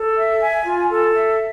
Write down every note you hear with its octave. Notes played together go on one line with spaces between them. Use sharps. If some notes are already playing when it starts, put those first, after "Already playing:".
Already playing: A4
E5
G#5
F4
A4
E5